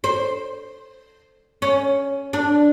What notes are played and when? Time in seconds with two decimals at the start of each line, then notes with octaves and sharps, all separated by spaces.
0.04 C5
1.62 C#4
2.33 D4